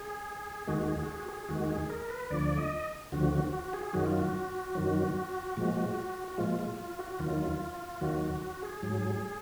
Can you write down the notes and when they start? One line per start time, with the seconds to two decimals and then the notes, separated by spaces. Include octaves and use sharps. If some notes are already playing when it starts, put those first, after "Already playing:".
Already playing: G#4
0.67 D#2 D#3 G#3 F#4
0.88 G#4
1.03 F#4
1.08 G#4
1.20 F#4
1.29 G#4
1.49 D#2 D#3 G#3 F#4
1.69 G#4
1.90 A#4
2.10 B4
2.30 D2 D3 F3 D5
2.58 D#5
3.12 D2 D3 F3 F#4
3.33 F#4
3.52 F#4
3.73 G#4
3.93 F#2 D#3 F#3 F#4
4.06 F4
4.18 F#4
4.75 F#2 D#3 F#3
5.57 A#2 F3 G#3
6.28 F#4
6.38 A#2 F3 G#3 F4
6.59 F4
6.79 F4
6.99 F#4
7.19 D#2 D#3 F#3 F4
8.01 D#2 D#3 F#3 F#4
8.21 F#4
8.42 F#4
8.63 G#4
8.82 G#2 F#3